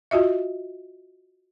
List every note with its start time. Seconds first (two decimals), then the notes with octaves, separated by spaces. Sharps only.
0.11 F4 F#4 D#5 E5